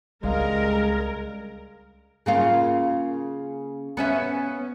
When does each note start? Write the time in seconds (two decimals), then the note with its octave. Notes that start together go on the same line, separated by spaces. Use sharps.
0.23 C#2 C#3 G3 G#3 C4 A#4 F5
2.26 C#3 A#3 F4
3.97 B3 C#4 E5